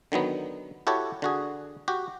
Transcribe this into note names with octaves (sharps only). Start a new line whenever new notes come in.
D3 D#3 F#3 B3
E4 F#4 G4 A4 C#5
D3 F#4 G#4
F#4 G4